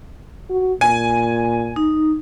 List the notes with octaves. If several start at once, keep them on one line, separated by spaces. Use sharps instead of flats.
F#4
A#2 G#5
D#4